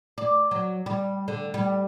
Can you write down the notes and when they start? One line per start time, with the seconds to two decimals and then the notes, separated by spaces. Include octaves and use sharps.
0.18 D5
0.51 F#3
0.86 G3
1.28 D3
1.54 G3